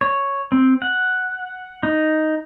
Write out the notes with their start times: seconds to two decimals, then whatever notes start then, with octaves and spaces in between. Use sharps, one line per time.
0.01 C#5
0.52 C4
0.82 F#5
1.83 D#4